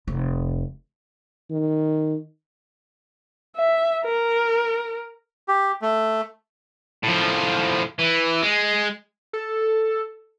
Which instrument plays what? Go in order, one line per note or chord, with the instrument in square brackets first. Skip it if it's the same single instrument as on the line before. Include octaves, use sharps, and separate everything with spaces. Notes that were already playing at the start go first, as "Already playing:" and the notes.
[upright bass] F1
[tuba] D#3
[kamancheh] E5
A#4
[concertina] G4
A3
[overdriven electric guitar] A2 F3
E3
G#3
[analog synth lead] A4